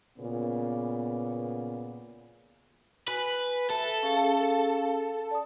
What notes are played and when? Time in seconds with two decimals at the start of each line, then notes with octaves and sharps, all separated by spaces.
0.18 A#2 C#3 B3
3.08 F#4 B4 G#5
3.70 A4 E5
4.03 C#4 G#4 F5
5.31 D5 A5 D#6